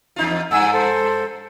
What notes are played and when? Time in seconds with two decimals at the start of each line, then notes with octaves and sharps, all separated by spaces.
0.16 E2 D#4 F4
0.51 G2 F#5 G#5 E6
0.72 A4 C5